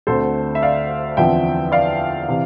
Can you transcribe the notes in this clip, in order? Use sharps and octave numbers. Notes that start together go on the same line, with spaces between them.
D2 D3 A3 C4 A4 C5
E5
D5 F5
E2 D3 F3 C4 E5 G5
D5 F5
C3 E3